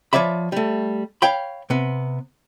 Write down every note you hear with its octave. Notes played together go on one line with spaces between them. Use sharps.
F3 C#5 D5 E5 B5
G3 A3
C#5 F5 G5 B5
C3 B3